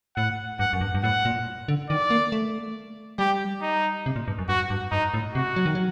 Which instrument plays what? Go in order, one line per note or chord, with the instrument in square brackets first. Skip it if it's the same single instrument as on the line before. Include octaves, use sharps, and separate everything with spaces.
[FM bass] A2 [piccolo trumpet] F#5
[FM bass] G2 [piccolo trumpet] F#5
[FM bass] F#2
G2
G2
[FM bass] A2 [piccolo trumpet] F#5
[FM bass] A#2
D3
[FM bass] D#3 [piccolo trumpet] D5
[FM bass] A#3
A3
[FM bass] G3 [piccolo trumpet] G4
[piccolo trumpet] D#4
[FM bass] C3
A#2
G2
F#2
[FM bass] G2 [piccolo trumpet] F#4
[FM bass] G2
[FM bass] G2 [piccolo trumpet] D#4
[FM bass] A2
[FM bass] C3 [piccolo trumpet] F#4
[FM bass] F#3
D#3
F#3